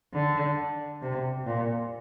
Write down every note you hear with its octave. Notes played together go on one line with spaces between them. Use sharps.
D3
C3
A#2